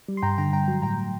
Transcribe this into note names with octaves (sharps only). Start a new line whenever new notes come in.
G3
C6
G2 G5 A#5
D3 G5 A#5
G2 G5 A#5
F#3
A2 G5 A#5
A2